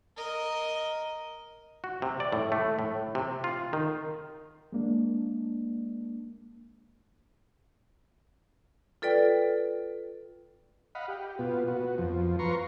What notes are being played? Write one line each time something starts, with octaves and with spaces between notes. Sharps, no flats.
A#4 D#5
F#4
C3
D5
A2
A3
A2
C3
F4
D#3
G#3 A#3 D4
F4 A4 B4 D5 G5
D#5 F5 F#5 B5
G4
B2 B3 F4
B3 F#4
F2 F3
F4 B4 A#5 C6 C#6